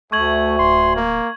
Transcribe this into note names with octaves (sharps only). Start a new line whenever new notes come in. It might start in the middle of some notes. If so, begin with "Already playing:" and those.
D2 A3 C#6 G#6 F#7
D1 C6
A#3